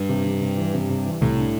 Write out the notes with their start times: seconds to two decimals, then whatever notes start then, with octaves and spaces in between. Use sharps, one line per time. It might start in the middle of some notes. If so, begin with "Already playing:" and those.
Already playing: G2
0.09 C3
0.25 C3
0.41 C3
0.57 E3
0.73 C3
0.89 C3
1.06 E3
1.21 C2 A2
1.38 D4